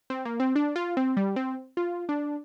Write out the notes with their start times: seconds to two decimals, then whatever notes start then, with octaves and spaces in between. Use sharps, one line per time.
0.10 C4
0.25 A#3
0.40 C4
0.56 D4
0.76 F4
0.97 C4
1.17 G3
1.36 C4
1.77 F4
2.09 D4